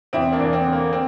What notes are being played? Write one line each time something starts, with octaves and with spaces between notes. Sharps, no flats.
E2 C4 E4
A#3 D4
E2
C4
D3
A#3
C4